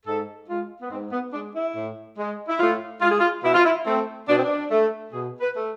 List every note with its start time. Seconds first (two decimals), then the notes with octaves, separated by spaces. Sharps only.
0.06 G#2 A4
0.48 G#3 F4
0.82 B3
0.91 G#2 C4
1.12 B3
1.33 G#3 D4
1.54 E4
1.75 A2
2.18 G#3
2.48 E4
2.59 A2 F4
3.01 G#3 F4
3.11 G#4
3.20 F4
3.43 B2 E4
3.54 F4
3.65 E4
3.86 A3 C4
4.29 B2 D4
4.37 C4
4.44 D4
4.71 A3
5.13 B2 G#4
5.41 B4
5.55 A3